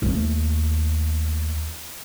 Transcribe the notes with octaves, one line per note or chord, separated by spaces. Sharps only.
D#2 A3